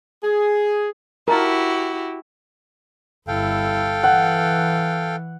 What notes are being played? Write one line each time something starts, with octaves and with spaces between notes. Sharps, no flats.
G#4
E4 F#4 G4 A#4 A5 A#5
G1 E4 A4 F5 G5
E3 F#5